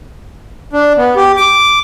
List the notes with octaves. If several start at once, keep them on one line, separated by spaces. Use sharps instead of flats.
D4
B3
G4
D6